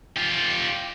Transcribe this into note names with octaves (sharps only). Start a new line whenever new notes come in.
F4 G4